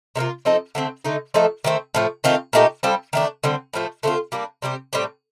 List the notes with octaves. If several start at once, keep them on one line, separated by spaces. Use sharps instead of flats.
C3 G3 A#3 F4
F3 C4 D#4 A4
D3 A3 C4
D3 A3 D#4
F3 A3 D#4 A4
D#3 A3 C4
A2 F3 A3
D#3 A3 C4 F4
A#2 A3 D#4 G4
G3 C4 F4 A4
D#3 A3 D4
D3 G3 C4
A2 F3 A3
D3 A3 C4 F4
G3 A#3 D4
C3 G3 C4 G4
A2 G3 C4 G4